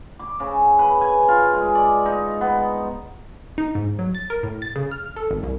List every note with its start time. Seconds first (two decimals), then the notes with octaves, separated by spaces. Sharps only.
0.19 D6
0.40 C#3
0.79 B4
1.01 G#5
1.28 F4
1.54 G#3
1.75 D5
2.06 D#4
2.41 B3
3.58 D#4
3.75 G#2
3.99 F#3
4.15 A6
4.30 A#4
4.43 A2
4.62 A6
4.76 C#3
4.91 F6
5.16 A4
5.31 G#1
5.43 C2